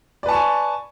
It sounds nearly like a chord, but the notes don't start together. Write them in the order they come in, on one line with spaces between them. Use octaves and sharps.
D5 B4 A5 C#6 G#5